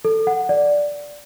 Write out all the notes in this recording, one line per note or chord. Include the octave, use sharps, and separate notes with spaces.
A4
F#5
D5